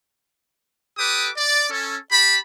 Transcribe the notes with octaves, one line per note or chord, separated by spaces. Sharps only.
G4 A4 B4 D6 D#6
D5
C#4 A4
G4 A5 B5